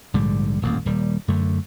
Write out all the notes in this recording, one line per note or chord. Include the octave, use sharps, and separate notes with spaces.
A#1 G#2 D3 G3
D#1 A1 F2 A#3
D#1 G3
F#2 D3 A3